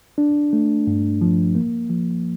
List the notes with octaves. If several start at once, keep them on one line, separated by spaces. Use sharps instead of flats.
D4
A3
G2
F3
A#3
F3